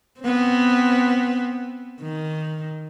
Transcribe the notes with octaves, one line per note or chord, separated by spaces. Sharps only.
B3 C4
D#3